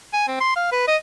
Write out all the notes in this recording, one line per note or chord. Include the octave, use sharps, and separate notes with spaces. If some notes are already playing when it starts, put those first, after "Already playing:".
G#5
C4
C6
F5
B4
D#5